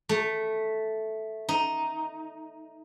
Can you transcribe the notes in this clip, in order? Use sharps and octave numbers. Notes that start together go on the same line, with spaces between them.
A3
D#4